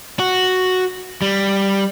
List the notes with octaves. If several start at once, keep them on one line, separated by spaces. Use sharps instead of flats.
F#4
G3